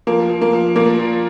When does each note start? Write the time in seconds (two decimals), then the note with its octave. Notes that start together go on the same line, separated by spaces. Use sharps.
0.07 F3 A#3
0.30 F3
0.41 A#3
0.53 F3
0.76 A#2 A#3
0.99 F3